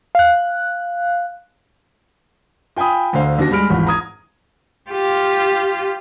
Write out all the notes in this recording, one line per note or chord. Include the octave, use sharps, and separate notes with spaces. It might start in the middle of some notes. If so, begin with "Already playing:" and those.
F5 F#6
F4 G5 G#5 B5 D#6
D2 D3 C5 F5
D#2 D4 F#4 A#6
G3 G#3 B5 F6 D7
G#1 E2 F4 B5
A#5 D#6 G#6
F4 G4